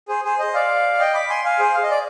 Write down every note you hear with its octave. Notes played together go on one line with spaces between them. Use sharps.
G#4 C5
G#4 C5
C5 D#5
D5 F5
D#5 G5
B5 D6
G#5 C6
F5 G#5
G#4 C5
F5
D#5
D5